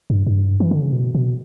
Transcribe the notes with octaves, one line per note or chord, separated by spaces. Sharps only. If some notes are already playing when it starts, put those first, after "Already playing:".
G2
G2
E3
D3
C#3
B2
B2